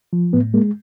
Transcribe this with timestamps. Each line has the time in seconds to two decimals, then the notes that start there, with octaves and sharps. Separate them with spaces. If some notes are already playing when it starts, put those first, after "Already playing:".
0.13 F3
0.33 A2 B3
0.54 G#3 A#3